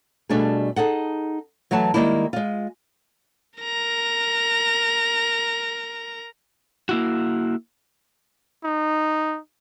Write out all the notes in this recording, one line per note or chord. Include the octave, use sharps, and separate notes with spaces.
B2 G3 A3 D4 F#4 G#4
D#4 G#4 A4 F#5
E3 F#3 A3 F#4 A5
D#3 F3 G3 G#3 A#3 E4
G#3 F4
A#4 A#5
A#3 E4 F#4
D#4